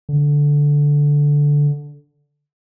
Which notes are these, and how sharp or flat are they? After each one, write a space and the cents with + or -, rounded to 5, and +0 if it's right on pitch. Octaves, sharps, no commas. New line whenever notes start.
D3 -10